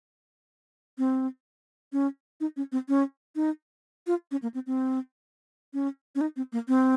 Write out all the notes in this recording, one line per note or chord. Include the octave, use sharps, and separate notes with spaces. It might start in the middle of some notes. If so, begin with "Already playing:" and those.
C4
C#4
D#4
C#4
C4
C#4
D#4
F4
C#4
A#3
C4
C4
C#4
C#4
D#4
C4
A#3
C4